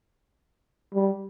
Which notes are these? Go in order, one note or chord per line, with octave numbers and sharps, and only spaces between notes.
G3